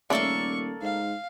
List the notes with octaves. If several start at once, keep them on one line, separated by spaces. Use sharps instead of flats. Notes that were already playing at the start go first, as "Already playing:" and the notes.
D#1 C#3 A3 A#3 A4 D5 C#6
G#2 F5